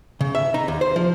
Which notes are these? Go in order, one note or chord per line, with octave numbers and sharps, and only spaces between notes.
C#3
E5
D#4
D#2
C5
F3